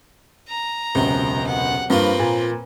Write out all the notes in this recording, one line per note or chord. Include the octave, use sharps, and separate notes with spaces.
A#5
E1 C#2 C3 F#3
F#5
G2 F3 A#3 C4 F4 B4
A#2